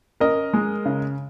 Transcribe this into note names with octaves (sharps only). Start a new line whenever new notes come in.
C#4 A#4 D#5
G#3
C#3